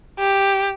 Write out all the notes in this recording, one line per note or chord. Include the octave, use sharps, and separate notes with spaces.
G4